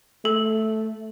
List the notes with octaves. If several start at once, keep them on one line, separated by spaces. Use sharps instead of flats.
A3 A4